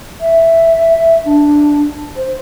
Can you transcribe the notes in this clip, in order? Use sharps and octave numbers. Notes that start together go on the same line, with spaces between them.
E5
D4
C5